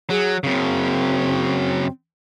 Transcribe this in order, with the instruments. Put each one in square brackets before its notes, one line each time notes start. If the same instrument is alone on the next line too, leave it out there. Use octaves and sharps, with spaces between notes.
[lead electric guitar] F#3 [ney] G#4
[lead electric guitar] F#2 C#3 [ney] C4